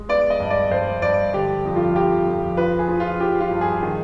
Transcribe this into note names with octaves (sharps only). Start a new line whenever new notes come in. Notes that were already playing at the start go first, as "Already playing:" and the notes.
Already playing: G#3
B3 D5
D#5
G2
D5
G2 C5
G2 D5
D3 G4
F2
F4
F2 G4
F2
F3 B4
G#4
F3
F4
F3 G4
F4
G2
G#4
D#3